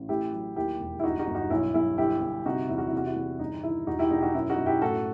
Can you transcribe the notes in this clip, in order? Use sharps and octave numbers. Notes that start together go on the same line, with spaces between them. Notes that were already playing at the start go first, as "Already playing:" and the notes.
Already playing: A1
A3 E4 G4
F#3
D#2 E4 G4
E1
E4
G1 D#4 F#4
D#4 F#4
G1
D#4 F#4
B1 E4
B1 E4
G1 E4 G4
G1
C3 D#4 F#4
E2 E4
F#4
E4
C3 F#4
E4
E2
G1 D#4
D#3 E4
E1 D#4 F#4
E4 G4
B2 D#4 F#4
G4
D#4 F#4
F#2 E4
D#4 F#4
F#2
E4 G4
A2 F#4 A4